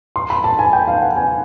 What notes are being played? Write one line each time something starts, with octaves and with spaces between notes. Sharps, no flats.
C6
B5
A5
G#5
G5
F5
F#5
G#5